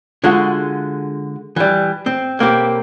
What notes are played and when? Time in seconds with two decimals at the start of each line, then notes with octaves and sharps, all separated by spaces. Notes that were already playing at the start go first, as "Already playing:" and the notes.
0.24 D3 G#3 F4 F#4
1.56 E3 G3
2.06 C4
2.39 B1 A#3 C4 G4